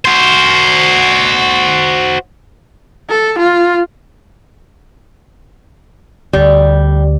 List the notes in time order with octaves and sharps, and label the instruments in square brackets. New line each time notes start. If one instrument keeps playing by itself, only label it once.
[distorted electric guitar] F#4 C5
[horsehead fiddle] A4
F4
[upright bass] D2 [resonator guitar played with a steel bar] G3